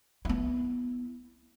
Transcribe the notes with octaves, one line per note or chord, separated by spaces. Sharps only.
B3 E4